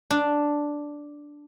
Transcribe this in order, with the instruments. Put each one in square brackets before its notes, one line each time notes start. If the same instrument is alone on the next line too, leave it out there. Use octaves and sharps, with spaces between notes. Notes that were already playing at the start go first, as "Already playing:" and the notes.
[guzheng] D4